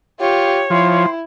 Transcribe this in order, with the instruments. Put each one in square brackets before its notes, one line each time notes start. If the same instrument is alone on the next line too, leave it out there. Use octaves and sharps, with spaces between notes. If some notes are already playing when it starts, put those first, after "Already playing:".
[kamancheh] F4 G4 [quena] C#5
[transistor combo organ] F3 [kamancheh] E4 [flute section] C5 G5 C6